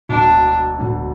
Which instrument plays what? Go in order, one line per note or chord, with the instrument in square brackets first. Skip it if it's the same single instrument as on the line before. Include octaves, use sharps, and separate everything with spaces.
[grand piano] E1 D2 D3 [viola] D4
[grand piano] E1 D2 D3